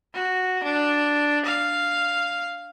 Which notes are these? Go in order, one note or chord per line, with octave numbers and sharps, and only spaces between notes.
F#4
D4
F5